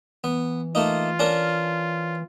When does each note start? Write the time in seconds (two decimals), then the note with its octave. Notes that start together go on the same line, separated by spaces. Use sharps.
0.24 E3 B3
0.75 A3 A#3 D#4 F4
1.19 C#4 D4 A#4